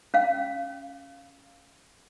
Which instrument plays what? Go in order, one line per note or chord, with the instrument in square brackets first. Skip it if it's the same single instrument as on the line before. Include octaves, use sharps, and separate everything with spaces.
[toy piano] C#4 F5